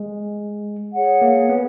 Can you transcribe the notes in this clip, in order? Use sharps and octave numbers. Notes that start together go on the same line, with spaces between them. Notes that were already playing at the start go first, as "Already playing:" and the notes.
Already playing: G#3
G#4 C#5 F#5
A#3
B3